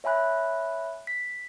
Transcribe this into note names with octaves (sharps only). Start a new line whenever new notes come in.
C#5 E5 G#5 B5 F#6
B6